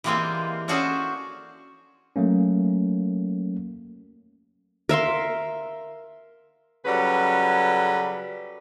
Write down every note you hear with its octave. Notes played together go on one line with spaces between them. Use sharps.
E3 G3 G#3 A#3 C4 F4
C#4 D4 F#4 G#4 A4 C5
F#3 A3 A#3 C#4
A#4 E5 F5 C6
C#3 F#3 G3 C#4 A4 B4